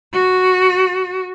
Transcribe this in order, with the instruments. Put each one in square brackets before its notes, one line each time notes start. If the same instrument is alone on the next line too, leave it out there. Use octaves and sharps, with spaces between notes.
[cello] F#4